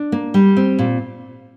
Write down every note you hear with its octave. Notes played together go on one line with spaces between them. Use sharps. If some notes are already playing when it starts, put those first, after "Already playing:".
Already playing: D4
A#3
G3
C4
A#2